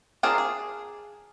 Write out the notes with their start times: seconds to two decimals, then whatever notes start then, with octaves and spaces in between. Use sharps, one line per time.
0.23 C4 D4 F4 G#4 A#4
0.38 G#4